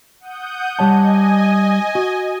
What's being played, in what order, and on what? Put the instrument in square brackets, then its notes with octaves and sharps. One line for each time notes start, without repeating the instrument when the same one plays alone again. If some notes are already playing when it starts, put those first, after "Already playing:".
[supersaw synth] F#5 D#6 G6
[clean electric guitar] G3 C#5 A5 [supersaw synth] D#5 G#5
[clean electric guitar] F#4